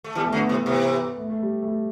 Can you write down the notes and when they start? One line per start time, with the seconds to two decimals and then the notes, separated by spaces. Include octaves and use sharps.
0.04 A3
0.15 E3 G3 B3
0.26 A3
0.32 D3 F#3
0.37 B3
0.49 C3 E3
0.66 C3 E3 B3
1.17 A3
1.30 A3
1.43 G3
1.62 A3
1.68 G3